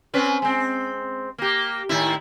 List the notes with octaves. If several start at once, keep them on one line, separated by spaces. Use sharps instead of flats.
C4 C#4 B4
G#3 C4
A#3 G4
A2 D#3 E4